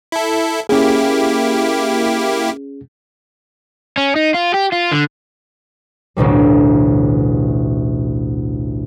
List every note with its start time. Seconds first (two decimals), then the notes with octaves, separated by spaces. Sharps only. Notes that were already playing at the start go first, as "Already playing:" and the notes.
0.12 E4 A4
0.69 A#3 C#4 E4 G4 G#4
3.97 C#4
4.16 D#4
4.34 F4
4.54 G4
4.72 F4
4.92 D3
6.17 A1 D2 B2 G3